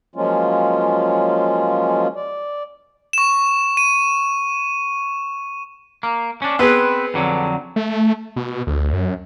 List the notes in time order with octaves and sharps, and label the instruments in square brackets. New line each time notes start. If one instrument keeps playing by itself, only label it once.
[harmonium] F3 F#3 G#3 A#3 C#4 F4
D5
[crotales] C#6 E7
D#7
[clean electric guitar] A#3
C#4 D4
[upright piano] B3 G#4 [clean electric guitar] C4 B4
[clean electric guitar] F2 D3 F#3
[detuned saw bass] A3
B2
D2
F#2